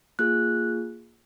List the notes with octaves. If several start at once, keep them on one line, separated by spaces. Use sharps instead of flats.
A#3 F4 G#4 F#6